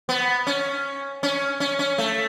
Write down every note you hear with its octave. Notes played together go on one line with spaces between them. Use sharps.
B3
C#4
C#4
C#4
C#4
A3